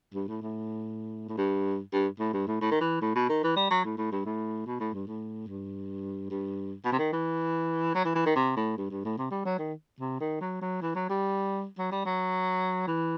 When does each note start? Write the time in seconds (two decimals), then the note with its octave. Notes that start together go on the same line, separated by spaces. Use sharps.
0.14 G2
0.28 A2
0.42 A2
1.29 A2
1.37 G2
1.93 G2
2.19 A2
2.34 G2
2.47 A2
2.61 A2
2.71 D#3
2.81 E3
3.01 A2
3.16 B2
3.29 D#3
3.43 E3
3.56 G3
3.71 F#3
3.84 A2
3.97 A2
4.12 G2
4.25 A2
4.66 B2
4.80 A2
4.93 G2
5.07 A2
5.48 G2
6.30 G2
6.85 B2
6.92 C3
6.99 D#3
7.13 E3
7.95 F#3
8.05 E3
8.15 E3
8.26 D#3
8.36 C3
8.56 A2
8.77 G2
8.90 G2
9.05 A2
9.18 C3
9.31 G3
9.45 F#3
9.59 D#3
10.00 C3
10.20 D#3
10.41 F#3
10.62 F#3
10.82 E3
10.95 F#3
11.09 G3
11.78 F#3
11.92 G3
12.05 F#3
12.87 E3